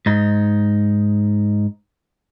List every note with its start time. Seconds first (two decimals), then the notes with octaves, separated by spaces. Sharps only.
0.06 G#2 D#4